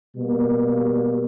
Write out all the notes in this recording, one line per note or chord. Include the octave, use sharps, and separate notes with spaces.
B2 G3 A#3